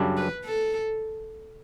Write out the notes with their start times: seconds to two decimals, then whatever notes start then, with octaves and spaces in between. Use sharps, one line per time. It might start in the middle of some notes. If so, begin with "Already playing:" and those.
Already playing: F#2 C#3 G3 D4
0.17 B4
0.45 A4